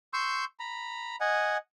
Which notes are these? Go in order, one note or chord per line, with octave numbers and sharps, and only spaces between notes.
C6 C#6 E6 G6
A#5 B5
D#5 F#5 G#5